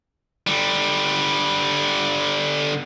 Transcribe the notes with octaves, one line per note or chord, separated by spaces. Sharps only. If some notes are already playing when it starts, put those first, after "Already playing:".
D3 G3